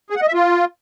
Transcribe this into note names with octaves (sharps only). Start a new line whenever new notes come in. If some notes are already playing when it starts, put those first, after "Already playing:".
G#4
F#5
D#5
E5
F4